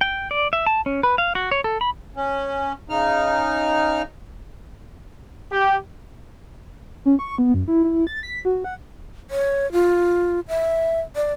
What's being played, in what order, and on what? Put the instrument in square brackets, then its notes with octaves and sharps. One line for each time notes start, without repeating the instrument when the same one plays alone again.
[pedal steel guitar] G5
D5
E5
A5
C#4
B4
F5
F#4
C#5
A4
B5
[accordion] C#4
C#3 D#4 F6
[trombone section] G4
[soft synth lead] C#4
C#6
B3
F#2
E4
E4
A6
B6
F#4
F#5
[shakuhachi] C#5
F4
E5
D5